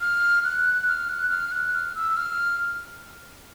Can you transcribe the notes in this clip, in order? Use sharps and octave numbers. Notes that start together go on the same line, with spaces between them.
F6
F#6
F6
F#6
F6
F#6
F6
E6
F6